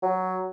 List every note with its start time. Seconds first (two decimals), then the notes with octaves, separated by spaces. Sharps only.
0.03 F#3